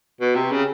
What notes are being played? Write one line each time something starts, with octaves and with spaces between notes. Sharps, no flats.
B2
C3
C#3